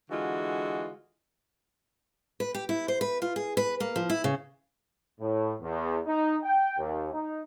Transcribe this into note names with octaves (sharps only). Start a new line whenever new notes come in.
D3 E3 G#3 F4 F#4
B4
G4
E4
C5
B4
F4
G#4
B4
A#3
F3
E4
C#3
A2
E2
D#4
G5
D#2
D#4